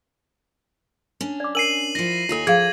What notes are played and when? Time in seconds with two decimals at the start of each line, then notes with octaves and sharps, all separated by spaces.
1.21 C#4 D4
1.40 D5 D6
1.55 A#4 G#5 C7 D#7 F#7
1.95 F3 E4 A#6
2.29 D#2 F4 A4 C#5 G#5
2.47 F3 G#4 F5 G#6